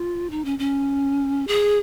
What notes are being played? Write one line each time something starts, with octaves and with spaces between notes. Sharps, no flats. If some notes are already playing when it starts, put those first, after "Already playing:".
Already playing: F4
D#4
C#4
C#4
G#4